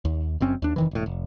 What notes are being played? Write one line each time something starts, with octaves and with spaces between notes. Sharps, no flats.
D#2
F#1 F#2 C4 C#4
D#2 D4
F1 D#3 E3
E1 A2
F1